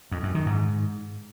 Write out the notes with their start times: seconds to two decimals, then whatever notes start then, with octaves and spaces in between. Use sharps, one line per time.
0.12 F2
0.23 F#2
0.35 D#3
0.46 G#2